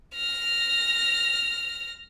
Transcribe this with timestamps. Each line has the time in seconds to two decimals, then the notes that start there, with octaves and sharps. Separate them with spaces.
0.15 F6 A#6